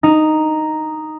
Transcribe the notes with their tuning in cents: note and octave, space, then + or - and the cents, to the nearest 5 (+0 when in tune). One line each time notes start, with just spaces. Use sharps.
D#4 -5